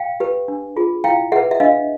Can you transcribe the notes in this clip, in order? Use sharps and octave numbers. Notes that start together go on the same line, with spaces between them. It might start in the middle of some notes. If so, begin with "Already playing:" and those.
Already playing: F5 G5
G4 B4
D4
F4 G#4
E4 F5 G5
G#4 B4 E5 F#5
E5
D4 D#5 F5